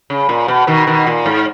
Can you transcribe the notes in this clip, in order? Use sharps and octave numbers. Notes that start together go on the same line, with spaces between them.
C#3
A#2
B2
B2 D#3
B2 D#3
A#2
G#2